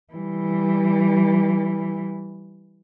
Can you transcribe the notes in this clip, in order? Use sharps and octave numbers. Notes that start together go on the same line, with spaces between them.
E3 G3